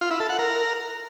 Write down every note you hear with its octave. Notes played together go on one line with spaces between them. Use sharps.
F4
E4
A4
F#5
A#4